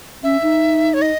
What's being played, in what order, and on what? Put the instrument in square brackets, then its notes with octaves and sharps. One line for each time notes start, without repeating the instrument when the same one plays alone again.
[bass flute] C#4 [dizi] E5
[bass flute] D#4
[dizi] C#5
D#5